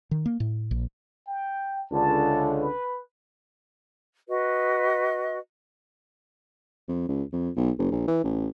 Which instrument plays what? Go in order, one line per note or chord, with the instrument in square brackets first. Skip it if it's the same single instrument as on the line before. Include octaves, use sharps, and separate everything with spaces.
[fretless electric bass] D#3
A#3
A2
A#1
[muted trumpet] G5
[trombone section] C#2 D3 [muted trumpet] A5
[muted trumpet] B4
[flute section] F#4 B4 D#5
[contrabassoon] F2
C#2
F2
B1
F#1
A#1
E3
A1